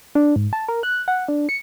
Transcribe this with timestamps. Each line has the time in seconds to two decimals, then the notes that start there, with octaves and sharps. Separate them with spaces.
0.15 D4
0.36 G#2
0.53 A5
0.68 A#4
0.83 F#6
1.08 F#5
1.28 D4
1.49 C#7